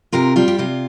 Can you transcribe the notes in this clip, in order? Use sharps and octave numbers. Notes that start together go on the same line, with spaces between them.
C3 F4 A#4
G3 F4
G4
C3 F4